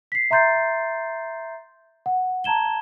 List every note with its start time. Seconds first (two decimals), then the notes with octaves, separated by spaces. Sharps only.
0.12 B6 C7
0.31 E5 A#5 C6 G6 A6 C7
2.06 F#5
2.44 A5 A#5 G#6 E7 G7